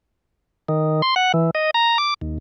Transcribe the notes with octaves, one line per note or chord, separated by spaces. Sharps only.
D#3
C6
F#5
E3
D#5
A#5
D6
D#2